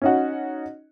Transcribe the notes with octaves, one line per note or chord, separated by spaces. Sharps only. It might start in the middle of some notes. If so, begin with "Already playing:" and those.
C#4 D#4 F#4